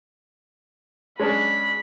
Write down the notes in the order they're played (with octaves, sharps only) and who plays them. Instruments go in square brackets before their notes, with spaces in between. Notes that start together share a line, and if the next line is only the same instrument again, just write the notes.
[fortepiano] G#3 C#4 D4 [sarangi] B5